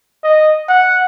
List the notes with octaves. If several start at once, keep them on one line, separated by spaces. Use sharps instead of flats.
D#5
F#5